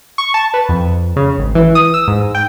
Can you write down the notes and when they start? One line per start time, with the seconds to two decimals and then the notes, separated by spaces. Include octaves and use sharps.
0.18 C#6
0.34 A5
0.54 B4
0.69 F2
1.16 C#3
1.38 G#1
1.55 E3
1.75 D#6
1.94 E6
2.08 G#2
2.35 G5